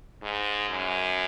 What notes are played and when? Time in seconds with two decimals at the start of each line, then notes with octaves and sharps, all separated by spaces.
0.23 G#2
0.70 F#2